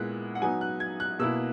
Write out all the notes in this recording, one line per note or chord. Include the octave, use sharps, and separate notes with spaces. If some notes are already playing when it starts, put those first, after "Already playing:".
Already playing: A#2 G#3 B3 E4 F#6
F#5
F#3 B3 D#4 G#5
F#6
G#6
F#6
B2 A#3 E4 E6